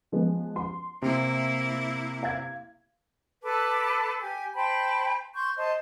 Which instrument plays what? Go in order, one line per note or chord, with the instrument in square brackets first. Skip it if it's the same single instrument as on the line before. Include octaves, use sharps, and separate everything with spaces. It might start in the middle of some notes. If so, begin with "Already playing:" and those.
[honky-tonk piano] F3 G#3 B3
C6
[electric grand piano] C3 [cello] A#3 E4
[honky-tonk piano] F5 G#6
[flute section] A4 B4 A5 D6
G4 G#5
C5 G5 A5 B5
C6 C#6 G6
C5 D#5 A5